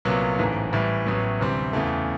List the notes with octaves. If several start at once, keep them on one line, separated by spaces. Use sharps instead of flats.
C2 A#2 F#3 B3
A1 G#2 E3 A3
A2 E3 G3
A1 A2 F#3 B3
D2 C3 E3 G3 C4
E2 C#3 E3 A3